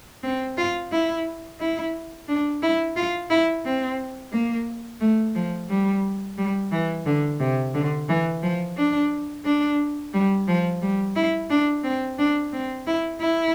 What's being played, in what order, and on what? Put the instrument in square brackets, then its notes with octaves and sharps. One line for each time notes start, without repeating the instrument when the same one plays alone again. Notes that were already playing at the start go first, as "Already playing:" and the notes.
[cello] C4
F4
E4
E4
D4
E4
F4
E4
C4
A#3
A3
F3
G3
G3
E3
D3
C3
D3
E3
F3
D4
D4
G3
F3
G3
E4
D4
C4
D4
C4
E4
E4